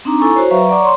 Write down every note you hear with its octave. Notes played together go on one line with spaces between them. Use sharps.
C4 D4 D#4 A#5 D6
E4 A4 G#5 A#5 C#6
F#4 C5 C#5
F#3 B4 E5 F5 A#5 C#6
D5 F#5 A#5 C#6 D6
C#5 C6